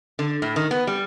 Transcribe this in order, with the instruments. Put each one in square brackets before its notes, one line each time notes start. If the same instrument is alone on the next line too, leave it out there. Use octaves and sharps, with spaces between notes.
[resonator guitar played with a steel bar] D3
A2
D#3
B3
G3